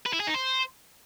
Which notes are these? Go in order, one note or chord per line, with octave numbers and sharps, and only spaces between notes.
B4
E4
G#4
D#4
C5